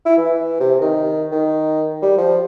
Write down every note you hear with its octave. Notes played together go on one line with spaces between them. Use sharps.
E4
E3
C3
D#3
D#3
G3
F3